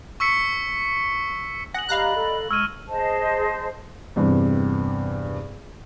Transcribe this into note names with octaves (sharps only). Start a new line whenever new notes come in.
C#6 E6 B6 C#7
F#5 G#5 D#6 A#6 F#7
G4 D5 D#5 F5 A#5 B5 F#6
A4
G#3 A5 C#6 E6 F6 G#6 D#7
G#4 C5 D#5 A5
E2 G2 C3